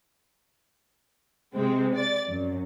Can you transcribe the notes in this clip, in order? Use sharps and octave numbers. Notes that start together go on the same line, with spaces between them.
C3 G#3 C4
D5 A6
F#2